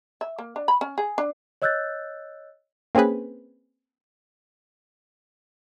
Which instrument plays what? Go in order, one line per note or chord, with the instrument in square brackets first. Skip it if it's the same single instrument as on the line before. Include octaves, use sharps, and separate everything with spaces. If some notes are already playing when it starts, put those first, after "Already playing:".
[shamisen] E5
A#3
D4
B5
C#4
G#4
D4
[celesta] C#5 D#5 E6 F#6 G6 A6
[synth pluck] A#3 C4 C#4 G#4 B4